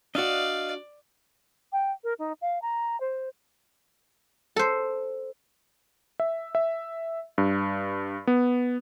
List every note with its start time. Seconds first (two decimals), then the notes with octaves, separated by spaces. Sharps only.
0.15 D4 F#4 D5 D#5 F5
1.73 G5
2.04 A#4
2.19 D#4
2.42 F5
2.62 A#5
3.00 C5
4.56 A4 C5
6.20 E5
6.55 E5
7.38 G2
8.27 B3